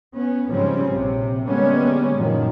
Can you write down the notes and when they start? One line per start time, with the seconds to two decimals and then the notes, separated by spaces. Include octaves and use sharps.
0.15 B3 C#4
0.49 G#2 C#3 F3 G3 C4 C#4
0.94 A#1 C3
1.48 D3 G3 G#3 A#3 B3 C#4
2.15 F#2 A#2 D#3 F3